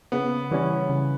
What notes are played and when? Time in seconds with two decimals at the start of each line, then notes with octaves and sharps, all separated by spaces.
0.12 C#3 B3
0.51 E3 G3 C#4
0.89 C#3